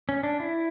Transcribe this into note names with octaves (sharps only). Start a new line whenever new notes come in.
C#4
D4
E4